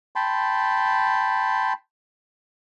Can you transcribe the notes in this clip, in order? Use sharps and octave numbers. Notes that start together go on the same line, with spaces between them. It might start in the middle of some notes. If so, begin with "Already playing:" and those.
G5 A5 B5 C6